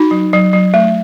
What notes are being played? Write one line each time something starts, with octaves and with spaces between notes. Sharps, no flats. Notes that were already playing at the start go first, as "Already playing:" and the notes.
Already playing: D#4 F#4
F#3
F#3
F#3
A3